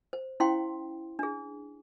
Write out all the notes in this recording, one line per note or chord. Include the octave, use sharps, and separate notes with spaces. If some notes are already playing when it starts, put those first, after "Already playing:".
C5
C#4 E4 C5 F5 G5 C6
D4 G#4